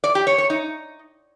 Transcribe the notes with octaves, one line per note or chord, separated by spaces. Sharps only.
D5
G4
C#5
C#5
D#4